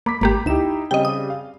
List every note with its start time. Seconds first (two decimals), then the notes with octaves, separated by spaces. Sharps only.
0.06 A#3 B5 D6 B6
0.21 G#1 A#3 G4
0.46 D2 D#4 E4 G4 E7
0.91 C#3 G3 C4 D#5 G5
1.05 D#6
1.30 F5